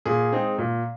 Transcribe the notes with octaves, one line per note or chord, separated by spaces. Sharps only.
A#2 G#4
G#3 C4 D#4
A#2